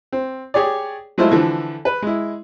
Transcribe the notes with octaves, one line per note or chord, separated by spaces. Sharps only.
C4
G4 G#4 C#5 D5
F#3 G#3 A3 E4 F4 C5
D3 E3 F3
B4
G#3 E4